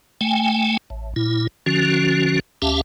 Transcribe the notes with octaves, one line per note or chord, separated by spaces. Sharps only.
A3 G5 G#5
A1
A#2 E4
D3 F3 C#4 F#4
D2 C#4 G4 E5 F5 A5